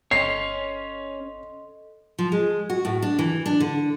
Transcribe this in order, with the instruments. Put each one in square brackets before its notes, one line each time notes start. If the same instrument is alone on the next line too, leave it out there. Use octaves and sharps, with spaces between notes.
[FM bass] G1 [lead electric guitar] C#4 C#5 [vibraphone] A4 D#5 C6 [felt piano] C7
[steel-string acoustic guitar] F3
G#3
F#4
A2
D4
E3
D4
D3